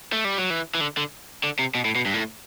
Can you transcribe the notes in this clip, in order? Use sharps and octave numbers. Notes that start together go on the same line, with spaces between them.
A3
G3
F#3
E3
E3
D3
D3
D3
C3
B2
A2
B2
G2
A2